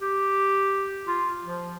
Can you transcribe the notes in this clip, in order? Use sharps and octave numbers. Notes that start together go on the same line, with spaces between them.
G4
F4
F3